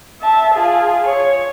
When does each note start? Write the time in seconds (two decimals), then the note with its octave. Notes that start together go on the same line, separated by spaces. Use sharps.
0.22 E5 A5
0.54 F4 G#4
1.05 C#5